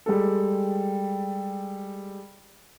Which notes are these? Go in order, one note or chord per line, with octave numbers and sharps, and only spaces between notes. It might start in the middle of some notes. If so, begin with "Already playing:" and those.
G3 G#3 A4